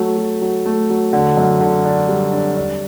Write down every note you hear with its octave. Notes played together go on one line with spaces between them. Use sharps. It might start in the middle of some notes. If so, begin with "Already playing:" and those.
Already playing: F#3 A3
F#3
F#3
A3
F#3
D3
F#2
D3
D4
G3
D4
D4